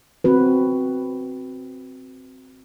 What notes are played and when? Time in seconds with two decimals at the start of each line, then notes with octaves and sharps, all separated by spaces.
0.24 C4 F#4 B4